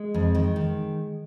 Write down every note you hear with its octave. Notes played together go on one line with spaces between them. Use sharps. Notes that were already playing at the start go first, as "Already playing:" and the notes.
Already playing: G#3
F2
D#3
D#3